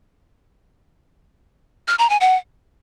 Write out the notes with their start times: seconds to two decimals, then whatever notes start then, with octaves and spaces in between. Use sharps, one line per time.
1.88 F6
1.99 A#5
2.10 G#5
2.21 F#5